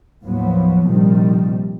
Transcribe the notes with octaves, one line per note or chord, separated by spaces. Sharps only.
D#2 A2 F3 F#3 B3
A#1 C3 D#3 F3 G3